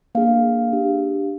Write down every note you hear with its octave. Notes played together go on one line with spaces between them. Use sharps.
A#3 D4 G#4 F5
D4 G4